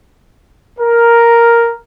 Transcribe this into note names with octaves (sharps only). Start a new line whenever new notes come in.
A#4